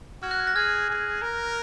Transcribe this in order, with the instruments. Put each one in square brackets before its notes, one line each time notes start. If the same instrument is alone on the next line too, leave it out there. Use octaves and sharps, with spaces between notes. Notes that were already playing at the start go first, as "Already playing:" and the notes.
[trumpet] F#4 [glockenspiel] F6 G#6
[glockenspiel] F#6 A#6
F6 G#6
F#6 A#6
[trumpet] G#4 [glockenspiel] F6 G#6
[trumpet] G#4
A#4